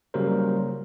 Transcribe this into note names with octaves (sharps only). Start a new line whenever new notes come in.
C#3 F#3 G3 A#3 A#4 C5